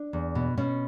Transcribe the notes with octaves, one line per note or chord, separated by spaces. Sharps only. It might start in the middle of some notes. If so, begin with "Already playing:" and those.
Already playing: D4
E2
B2
B2 C#4